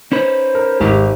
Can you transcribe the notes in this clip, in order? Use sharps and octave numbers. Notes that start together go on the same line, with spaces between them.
C#4 D#4 B4 C5
A#4
G#1 G4